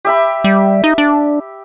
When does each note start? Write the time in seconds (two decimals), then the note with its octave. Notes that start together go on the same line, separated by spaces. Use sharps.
0.05 G4 E5 B5
0.44 G3
0.84 D#4
0.98 D4